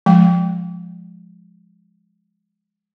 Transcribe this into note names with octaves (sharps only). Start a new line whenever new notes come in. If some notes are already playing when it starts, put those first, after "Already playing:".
F3 G#3 G5